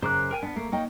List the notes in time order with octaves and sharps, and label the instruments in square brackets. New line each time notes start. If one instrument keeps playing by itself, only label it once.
[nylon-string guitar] F#2 C#3 A#4 [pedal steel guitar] C5 D6 F#6
[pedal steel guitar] A#4 G5 G#5
[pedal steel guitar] B3 [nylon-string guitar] D4
[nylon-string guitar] A3 [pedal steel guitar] A#3
[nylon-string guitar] A#3 D#4 G5 [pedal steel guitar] C#5